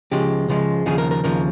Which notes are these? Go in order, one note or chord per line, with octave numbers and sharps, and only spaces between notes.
C#2 C#3 F3 G#3 G4
C#2 C#3 F3 G#3
D#2 C#3 F3 G#4
A#4
A#4
D#2 C#3 F3 A#4